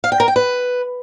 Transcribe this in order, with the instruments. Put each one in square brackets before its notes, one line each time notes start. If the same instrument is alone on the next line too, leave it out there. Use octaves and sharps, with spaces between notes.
[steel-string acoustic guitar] F5
G5
A#4
G5
B4